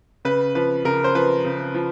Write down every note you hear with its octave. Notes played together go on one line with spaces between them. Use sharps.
C#3 B4
F3 B4
C#3 A#4
C5
F3 B4
C#3
F3